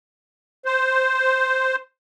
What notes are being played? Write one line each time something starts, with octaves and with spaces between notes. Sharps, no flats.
C5